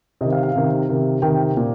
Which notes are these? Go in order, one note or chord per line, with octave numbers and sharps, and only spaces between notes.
C3 D#3 D#5
F5
F5
C3 D#3
C3 D#3
C3 D#3 G5
A#2